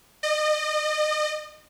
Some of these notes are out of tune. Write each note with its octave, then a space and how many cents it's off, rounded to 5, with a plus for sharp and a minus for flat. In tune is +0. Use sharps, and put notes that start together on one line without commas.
D#5 -35